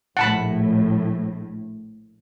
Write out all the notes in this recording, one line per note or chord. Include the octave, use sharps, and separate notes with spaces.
A#1 A2 F#5 A5 B5